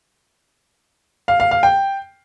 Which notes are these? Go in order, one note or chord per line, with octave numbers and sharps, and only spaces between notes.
F5
F5
F5
G5